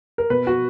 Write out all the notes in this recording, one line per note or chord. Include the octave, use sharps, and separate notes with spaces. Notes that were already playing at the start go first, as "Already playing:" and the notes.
A#4
B2 B4
F#4